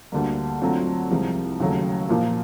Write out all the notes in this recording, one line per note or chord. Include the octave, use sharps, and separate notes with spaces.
D2 D3 G3 A#3
D3 F#3 A3 C4 F4
C2 C3 F3 G#3
D#2 C#3 F#3 A3
A#2 F3 A#3